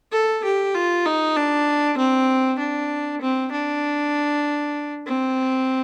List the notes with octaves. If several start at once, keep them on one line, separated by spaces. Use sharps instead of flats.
A4
G4
F4
D#4
D4
C4
D4
C4
D4
C4